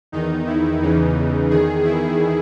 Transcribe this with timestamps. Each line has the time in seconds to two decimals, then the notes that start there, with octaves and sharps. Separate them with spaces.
0.12 E2 D#3 D#4
0.47 E4
0.81 E2 C#3 E3 D#4
1.50 E2 D#3 G#4
1.84 E4